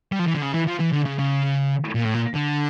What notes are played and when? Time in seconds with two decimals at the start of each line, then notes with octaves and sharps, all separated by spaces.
0.12 G3
0.19 F3
0.27 E3
0.34 D3
0.42 C#3
0.54 E3
0.67 F3
0.80 E3
0.93 D3
1.06 C#3
1.19 C#3
1.95 A#2
2.05 A2
2.14 A#2
2.34 D3